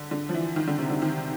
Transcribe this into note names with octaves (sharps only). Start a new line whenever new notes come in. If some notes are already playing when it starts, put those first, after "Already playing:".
Already playing: D3
D3
F3
E3
D#3
D3
C3
D3
D#3